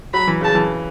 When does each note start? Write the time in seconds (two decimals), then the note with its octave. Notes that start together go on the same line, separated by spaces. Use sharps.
0.13 F#3 B5
0.27 E3
0.41 C#3 A5
0.55 E3